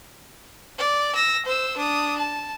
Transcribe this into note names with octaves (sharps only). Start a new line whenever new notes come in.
D5
E6 A#6
C5 E6
D4 D#6
A5